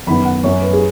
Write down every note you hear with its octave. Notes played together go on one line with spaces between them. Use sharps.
F#2 D#3 B3 B5
F#5
F#2 F#3 C#4 C#5
B4
G#4